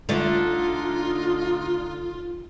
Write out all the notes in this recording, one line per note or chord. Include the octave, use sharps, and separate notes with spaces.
D3 A3 D#4 F4